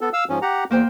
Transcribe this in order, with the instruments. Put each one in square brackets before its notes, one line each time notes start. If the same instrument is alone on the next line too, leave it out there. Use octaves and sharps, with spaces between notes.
[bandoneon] B3 A4
F5 E6
G#2 F3 C#4
G4 F#5 A#5
[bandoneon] E2 [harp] A#3 C5 G5